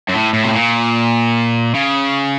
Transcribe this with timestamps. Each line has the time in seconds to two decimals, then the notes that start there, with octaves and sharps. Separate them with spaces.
0.09 F#2
0.14 A2
0.33 A2
0.44 C3
0.53 A#2
1.74 C#3